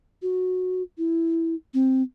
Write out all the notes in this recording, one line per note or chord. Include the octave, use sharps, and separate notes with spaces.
F#4
E4
C4